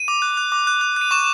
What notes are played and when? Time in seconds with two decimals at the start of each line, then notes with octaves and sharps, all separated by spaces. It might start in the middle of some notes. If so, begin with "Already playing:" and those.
Already playing: D#7
0.08 D6
0.22 F#6
0.37 F#6
0.52 D6
0.67 F#6
0.81 F#6
0.96 F#6 D#7
1.11 C#6 E7